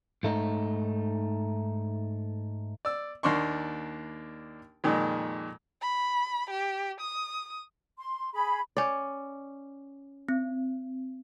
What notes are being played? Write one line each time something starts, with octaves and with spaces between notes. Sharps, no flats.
G#2 A3 D#4
D5 E6
D#2 A#3 D4 C6 C#6
F2 A#2 D#3 G#3
B5
G4
D#6
C6
G#4 B5
C#4 D5
C4